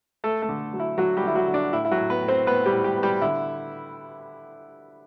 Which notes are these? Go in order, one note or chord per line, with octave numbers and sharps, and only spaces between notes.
A3 A4
A3 A4
D3
F#3
E4
D3 F#3 F#4
G3 G4
D3 E4
F#3 F#4
D3
D4
A2 E4
E4
F#3 F#4
A2
B3 B4
A2
C4 C5
A2 B3 B4
G3 G4
A2
G3 G4
B3
G3 G4
D3 E4